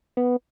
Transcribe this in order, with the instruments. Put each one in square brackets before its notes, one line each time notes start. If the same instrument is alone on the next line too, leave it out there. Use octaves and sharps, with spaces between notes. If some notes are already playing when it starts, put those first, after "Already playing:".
[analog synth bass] B3